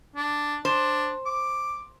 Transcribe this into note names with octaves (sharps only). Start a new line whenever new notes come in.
D4
D4 C5
D6